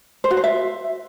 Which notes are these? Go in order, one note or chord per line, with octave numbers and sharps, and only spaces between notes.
C5
F#4
C5
E5